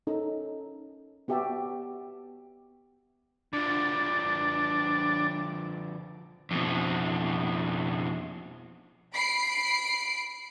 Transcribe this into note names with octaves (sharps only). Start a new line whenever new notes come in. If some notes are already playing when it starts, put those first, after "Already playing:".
C#4 D#4 A4
B3 F#4 G4 E5 A5
D3 F3 D4
F2 B2
B5 C7 D7